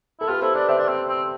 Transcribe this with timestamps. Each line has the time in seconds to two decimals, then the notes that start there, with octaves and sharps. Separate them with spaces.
0.20 E4 A4
0.29 F4 G4 B4
0.42 E4 A4 C5
0.55 D4 B4 D5
0.68 C4 C5 E5
0.78 D4
0.88 C4
1.09 C4